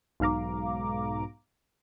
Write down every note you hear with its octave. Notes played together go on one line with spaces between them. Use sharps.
B1 G#2 F5 A#5 D6